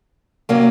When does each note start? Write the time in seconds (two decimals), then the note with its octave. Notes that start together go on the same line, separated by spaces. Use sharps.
0.49 C3 F#3 A#3 C#4